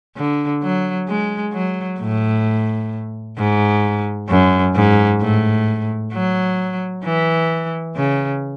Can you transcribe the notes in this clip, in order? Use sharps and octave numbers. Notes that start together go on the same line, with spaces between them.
D3
F#3
G#3
F#3
A2
G#2
F#2
G#2
A2
F#3
E3
C#3